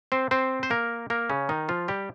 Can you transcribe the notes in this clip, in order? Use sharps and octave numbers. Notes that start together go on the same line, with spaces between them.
C4 C5
C4 C5
C5
A#3 A#4
A#3 A#4
C#3 C#4
D#3 D#4
F3 F4
G3 G4